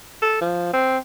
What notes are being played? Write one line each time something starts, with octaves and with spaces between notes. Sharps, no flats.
A4
F3
C4